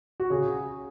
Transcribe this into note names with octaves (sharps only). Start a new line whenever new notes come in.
F#4
C#3 G#4